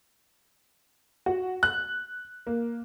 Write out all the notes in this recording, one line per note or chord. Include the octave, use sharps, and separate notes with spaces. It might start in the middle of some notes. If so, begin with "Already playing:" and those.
F#4
F#6
A#3